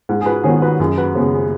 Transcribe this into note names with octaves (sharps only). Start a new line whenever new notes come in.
G#2
G#4
F#4 B4
D#3 G#3 B3 G#4 C#5
F#4 B4
F#2 G#4
F#4 B4
C#3 G#3 B3
G#4